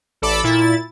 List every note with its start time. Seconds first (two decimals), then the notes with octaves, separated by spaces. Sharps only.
0.22 A1 A4 D5 B5 D6 E6
0.44 A#2 E4 A6